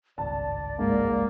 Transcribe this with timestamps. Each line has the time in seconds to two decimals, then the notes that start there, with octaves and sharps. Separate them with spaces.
0.18 G#1 C#2 G2 D5 A5
0.79 G#2 A#3